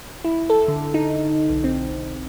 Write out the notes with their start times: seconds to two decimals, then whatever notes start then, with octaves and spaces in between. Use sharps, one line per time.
0.24 E4
0.50 A4
0.68 D3
0.94 D#4
1.50 B1
1.64 C4